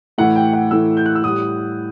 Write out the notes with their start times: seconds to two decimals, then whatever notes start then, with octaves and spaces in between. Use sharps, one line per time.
0.18 A2 E3 A3 F#5
0.36 G5
0.53 F#5
0.71 A2 E3 A3 E6
0.97 G6
1.06 F#6
1.15 E6
1.24 A2 G3 D#6